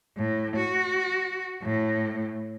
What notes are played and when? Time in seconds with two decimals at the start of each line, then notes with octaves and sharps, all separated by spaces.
0.17 A2
0.57 F#4
1.63 A2